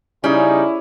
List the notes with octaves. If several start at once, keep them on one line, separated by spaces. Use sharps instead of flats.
C#3 G3 C#4 D#4 E4 G#4